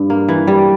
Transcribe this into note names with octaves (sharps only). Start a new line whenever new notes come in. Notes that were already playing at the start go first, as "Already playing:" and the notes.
Already playing: G2
A#3
E3
G3